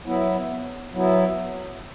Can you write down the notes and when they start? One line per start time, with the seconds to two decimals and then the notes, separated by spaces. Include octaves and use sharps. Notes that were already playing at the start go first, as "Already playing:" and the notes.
0.06 F#3 B3 E4
0.93 F#3 B3 E4